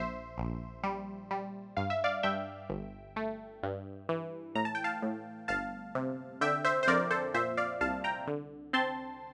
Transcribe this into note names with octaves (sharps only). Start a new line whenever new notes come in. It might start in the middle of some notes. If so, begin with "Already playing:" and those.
Already playing: A#1 C5 E5
A#1
G3
G3
G2 F5
E5
D5 F5
G2 E5 G5
G1
A3
G2
E3
A2 A#5
A5
G5
F5 A5
A2
G1 F5 A5
C3
D3 E5 G5
C5 E5
C5
F2 A#4 D5
A4 C5
A#2 C5 E5
D5 F5
C2 F5 A5
G5 A#5
D3
C4 A5 C6